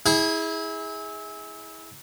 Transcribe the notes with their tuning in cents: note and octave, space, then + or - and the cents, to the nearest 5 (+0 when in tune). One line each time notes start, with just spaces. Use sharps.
E4 -30 G#4 -5